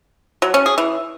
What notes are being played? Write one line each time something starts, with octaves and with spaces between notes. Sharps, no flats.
F#3
C#4
G#4
E3